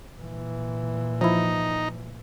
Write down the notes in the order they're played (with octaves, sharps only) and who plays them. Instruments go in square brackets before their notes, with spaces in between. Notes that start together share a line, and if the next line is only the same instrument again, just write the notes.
[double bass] A#2 E3
[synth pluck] F3 E4 [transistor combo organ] D#4